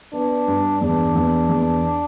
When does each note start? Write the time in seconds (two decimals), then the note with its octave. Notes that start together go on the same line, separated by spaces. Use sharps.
0.13 B3 D4
0.48 G2
0.81 E2 D4
1.15 E2
1.49 E2